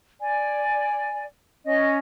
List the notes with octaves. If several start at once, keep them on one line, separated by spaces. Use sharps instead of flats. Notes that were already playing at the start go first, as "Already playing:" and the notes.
D5 G#5
C#4 D#5